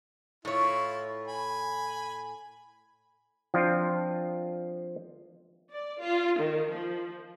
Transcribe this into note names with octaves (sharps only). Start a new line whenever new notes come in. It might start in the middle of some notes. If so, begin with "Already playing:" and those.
A2 E4 F4 C#5
G#5 B5
F3 C4 D4 F4
D5
F4
D#3
F3